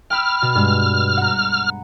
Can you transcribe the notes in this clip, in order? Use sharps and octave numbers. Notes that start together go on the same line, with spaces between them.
G5 B5 E6 F6
B2
G2 G#3
F#5 A#5